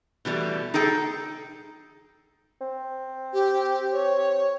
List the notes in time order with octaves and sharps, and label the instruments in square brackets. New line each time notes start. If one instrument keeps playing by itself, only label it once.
[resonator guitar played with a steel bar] B2 E3 G3 A3
D#4 G#4 A4 G5
[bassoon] C4
[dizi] G4
C#5